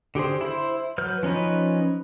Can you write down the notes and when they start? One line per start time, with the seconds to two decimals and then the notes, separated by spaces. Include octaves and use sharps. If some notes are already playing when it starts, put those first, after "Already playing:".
0.15 D3 G4 G#4 C5
0.41 E4 C5
0.98 F#3 B4 F6 G6
1.23 F3 C#4 D#4 B4